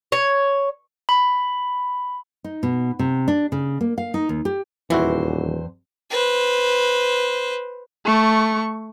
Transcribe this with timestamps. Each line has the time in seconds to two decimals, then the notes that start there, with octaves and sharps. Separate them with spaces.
0.12 C#5
1.09 B5
2.44 D#4
2.63 B2
2.99 C3
3.28 D4
3.52 C#3
3.81 A#3
3.98 F5
4.14 D#4
4.29 D#2
4.45 G4
4.90 D#1 E2 E3 E4 F#4 C5
6.10 B4 C5
8.05 A3 C#6